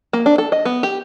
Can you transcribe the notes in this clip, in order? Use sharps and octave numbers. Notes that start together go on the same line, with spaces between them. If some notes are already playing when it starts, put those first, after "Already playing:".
A#3
D4
A4
D#5
B3
G4